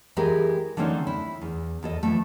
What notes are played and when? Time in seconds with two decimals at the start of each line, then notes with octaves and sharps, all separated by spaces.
0.17 E3 G#3 G4 A#4
0.77 D3 E3 A3 C4 C#4 D#4
1.07 E4
1.41 E2
1.83 E2 A4 D#5
2.03 E3 F3 A3